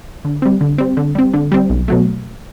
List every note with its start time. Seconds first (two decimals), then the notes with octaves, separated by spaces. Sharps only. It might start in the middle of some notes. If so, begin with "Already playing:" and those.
0.25 D3
0.42 G3 C4
0.61 D3
0.78 G3 C4
0.97 D3
1.15 G3 C4
1.34 D3
1.52 G3 C4
1.70 B1
1.88 B2 F#3 A3